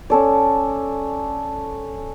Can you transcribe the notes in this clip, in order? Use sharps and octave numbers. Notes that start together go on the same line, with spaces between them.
C#4 A4 D5